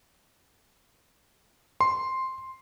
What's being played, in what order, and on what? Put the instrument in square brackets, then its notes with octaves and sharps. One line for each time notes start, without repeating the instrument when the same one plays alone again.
[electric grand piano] C6